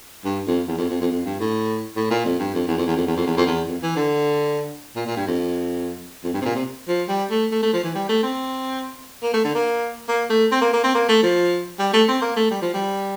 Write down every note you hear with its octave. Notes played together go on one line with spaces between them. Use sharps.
G2
F2
E2
F2
F2
F2
F2
G2
A2
A2
A#2
F2
G2
F2
E2
F2
E2
F2
E2
F2
E2
F2
E2
F2
E3
D3
A#2
A#2
G2
F2
F2
G2
C3
A#2
C3
F3
G3
A3
A3
A3
F3
E3
G3
A3
C4
A#3
A3
D3
A#3
A#3
A3
C4
A#3
A#3
C4
A#3
A3
F3
G3
A3
C4
A#3
A3
G3
F3
G3